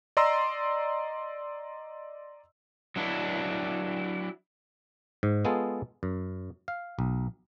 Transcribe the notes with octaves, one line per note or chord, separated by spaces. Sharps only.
D5 D#5 A#5 C6 E6
F#3 D4 E4
G#2
G#3 B3 F4 G#4 A4
F#2
F5
B1